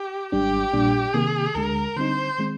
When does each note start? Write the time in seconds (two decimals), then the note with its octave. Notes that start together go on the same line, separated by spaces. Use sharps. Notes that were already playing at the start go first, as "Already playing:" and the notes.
Already playing: G4
0.32 G#1 G#2 G3 D4 G4
0.73 A#1 A#2 G3 D4
1.14 C3 D#3 A#3 G#4
1.55 D2 D3 G#3 A#4
1.96 D3 G3 C4 D#4 C5
2.38 D#3 G#3 C4